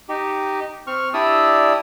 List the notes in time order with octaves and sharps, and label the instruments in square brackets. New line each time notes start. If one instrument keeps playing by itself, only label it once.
[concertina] D#4 G4
C4 C#6 F6
D4 E4 G4 D5 D#6 E6